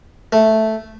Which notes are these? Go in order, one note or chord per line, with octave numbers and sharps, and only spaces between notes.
A3